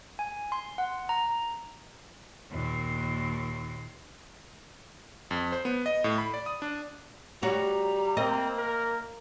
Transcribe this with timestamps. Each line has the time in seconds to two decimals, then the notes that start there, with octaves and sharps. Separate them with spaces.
0.19 G#5
0.52 C6
0.78 F#5
1.09 A#5
2.51 D#2 A#2
5.31 F2
5.52 C5
5.65 B3
5.86 D#5
6.04 A2
6.18 B5
6.34 D5
6.46 D#6
6.62 D4
7.43 G3 F#4 C#5 A#5
8.17 A#3 C4 D#5
8.58 A#4